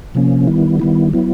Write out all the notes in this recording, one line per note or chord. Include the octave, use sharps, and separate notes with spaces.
C3 F3 A#3 C#4
D#3 G3 B3 E4
D#3 G3 B3 E4
F#3 B3 E4